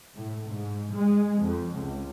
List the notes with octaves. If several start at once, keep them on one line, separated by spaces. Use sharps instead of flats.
A2
G#2
G#3
F2
C#2